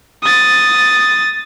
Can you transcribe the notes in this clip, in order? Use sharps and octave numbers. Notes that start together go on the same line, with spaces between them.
D#6 A6